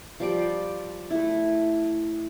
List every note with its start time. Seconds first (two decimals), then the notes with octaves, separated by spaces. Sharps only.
0.20 F3 G3 D5
1.11 A3 E4